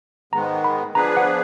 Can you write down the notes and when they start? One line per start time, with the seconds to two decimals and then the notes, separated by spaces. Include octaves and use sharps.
0.33 G#2 D#3 G#3 B3 A#5
0.64 B5
0.95 F3 B3 D4 G#4 B4 A#5
1.17 F#5